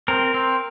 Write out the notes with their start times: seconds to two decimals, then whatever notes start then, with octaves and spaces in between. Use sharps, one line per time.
0.08 C4 A#4
0.34 C4